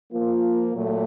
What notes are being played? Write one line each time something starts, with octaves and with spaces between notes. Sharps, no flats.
F3 A#3 F4
A#2 F#3 A3